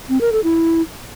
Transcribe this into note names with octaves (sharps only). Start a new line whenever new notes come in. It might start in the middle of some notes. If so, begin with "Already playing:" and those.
C4
A#4
A4
E4